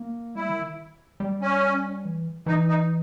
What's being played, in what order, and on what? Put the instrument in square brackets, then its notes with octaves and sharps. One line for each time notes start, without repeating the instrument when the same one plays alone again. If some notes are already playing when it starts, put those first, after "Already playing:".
Already playing: [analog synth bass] A#3
[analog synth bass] G3 [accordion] E4
[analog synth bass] D#3
G3
[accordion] C#4
[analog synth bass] E3
[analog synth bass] E3 [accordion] D#4
[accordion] D#4